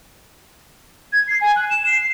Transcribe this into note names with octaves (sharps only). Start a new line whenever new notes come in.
G#6
C7
G#5
F#6
E7
C7
C7